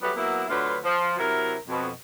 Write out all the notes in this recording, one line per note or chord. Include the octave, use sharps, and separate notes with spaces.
F#3 G3 A3 B3 G4 B4
F#3 A#3 B3 E4
D2 D3 F#3 F4 B4
F3
C3 F#3 E4 A#4
F2 B2